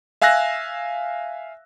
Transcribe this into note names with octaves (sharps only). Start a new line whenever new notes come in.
E5 F5 G#5 E6 F#6 A#6